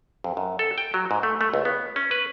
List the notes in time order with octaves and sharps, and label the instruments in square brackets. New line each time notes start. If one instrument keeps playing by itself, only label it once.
[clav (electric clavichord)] F2
F#2
A4
G5
F#3
G#2
A3
A3
C#2
B3
C#4
B4